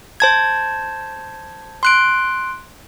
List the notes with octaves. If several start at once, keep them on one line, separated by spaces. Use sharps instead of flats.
C5 A5 G#6
C6 F#6 D7